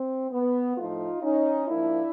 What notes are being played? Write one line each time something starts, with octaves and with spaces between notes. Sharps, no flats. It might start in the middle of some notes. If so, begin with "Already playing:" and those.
Already playing: C4
B3
A2 F3 A3 D#4 F4
C#4 D#4
G#2 F3 A#3 D4 E4